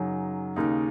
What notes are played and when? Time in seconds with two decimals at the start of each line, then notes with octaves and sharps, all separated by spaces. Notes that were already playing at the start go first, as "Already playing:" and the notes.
Already playing: F#2 C#3 F#3 D#4
0.56 D#2 C#3 A#3 D#4